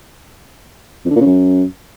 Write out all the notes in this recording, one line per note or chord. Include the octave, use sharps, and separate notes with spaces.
F2
D3
A#2
C#3
F#2